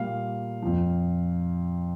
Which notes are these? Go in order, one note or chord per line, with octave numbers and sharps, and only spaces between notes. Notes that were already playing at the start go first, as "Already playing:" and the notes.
Already playing: A#2 G3 F5
F2 F3